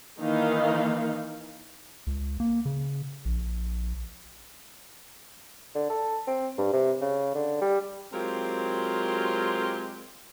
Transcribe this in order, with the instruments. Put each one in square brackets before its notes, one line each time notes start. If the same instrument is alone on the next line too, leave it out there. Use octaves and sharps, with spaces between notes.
[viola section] D#3 E3 A#3 D#4 F5
[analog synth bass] C#2
A#3
C#3
A#1
[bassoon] D3
A4
C4
G2
C3
C#3
D3
G3
[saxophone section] F#3 G#3 C4 F4 G4 A#4